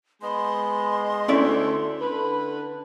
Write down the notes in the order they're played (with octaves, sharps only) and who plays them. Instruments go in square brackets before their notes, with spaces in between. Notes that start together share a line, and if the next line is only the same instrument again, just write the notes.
[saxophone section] G#3 B3 D#5 [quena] C6
[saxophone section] D2 D3 E5 [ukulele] C#4 E4 D5
[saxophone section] D3 B4